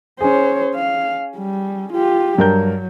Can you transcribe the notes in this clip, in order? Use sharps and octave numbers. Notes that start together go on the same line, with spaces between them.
C#4 G#4 C5 C#5
F5
G3
F4 G4
G2 F#3 A#4 G6